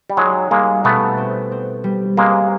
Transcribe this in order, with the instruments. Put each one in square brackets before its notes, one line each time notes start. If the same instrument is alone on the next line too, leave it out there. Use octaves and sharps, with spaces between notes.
[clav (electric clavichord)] G3
[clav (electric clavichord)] F#3 G#3 [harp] D#4
[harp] G3 [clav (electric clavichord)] G#3 A#3
[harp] B2 [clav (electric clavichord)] A3 B3
[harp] C4
C4
G3
[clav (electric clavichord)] G#3 A#3 [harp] C4